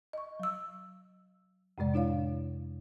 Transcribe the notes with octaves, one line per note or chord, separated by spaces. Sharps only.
D#5 C#6
F#3 E6
F2 A2 C3 G#3 D5
D4 E4 C#5 F5